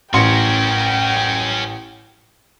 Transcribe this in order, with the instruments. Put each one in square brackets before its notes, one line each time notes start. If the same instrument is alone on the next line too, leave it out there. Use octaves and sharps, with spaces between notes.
[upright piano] A1 C6 C#7 [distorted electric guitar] C#4 A#4 [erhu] G5